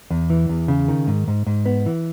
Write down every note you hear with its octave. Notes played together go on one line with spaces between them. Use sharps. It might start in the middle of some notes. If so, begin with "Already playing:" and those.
E2
E3
E2
C#3
D#3
G#2
G#2
G#2
B3
E3